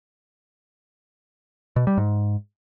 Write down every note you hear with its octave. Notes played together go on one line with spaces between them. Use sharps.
B2
G3
G#2